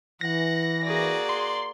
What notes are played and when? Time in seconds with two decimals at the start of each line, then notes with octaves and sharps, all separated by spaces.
0.21 E3 F#5 A#6
0.83 A#3 F#4 G#4 D5
1.29 C6